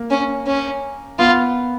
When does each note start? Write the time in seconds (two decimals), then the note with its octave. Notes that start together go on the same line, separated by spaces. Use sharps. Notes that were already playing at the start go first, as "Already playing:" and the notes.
Already playing: A#3
0.11 C#4
0.47 C#4
1.19 B3 F4